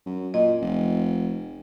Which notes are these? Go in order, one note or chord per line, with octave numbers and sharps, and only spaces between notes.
F#2
A#2 D#5
F1